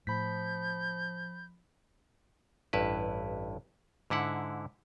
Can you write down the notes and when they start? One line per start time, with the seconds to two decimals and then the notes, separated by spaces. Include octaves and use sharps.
0.07 A2 F3 B5 G6 B6
2.73 A1 G2 E4 B4
4.10 G#2 D3 E4 F#5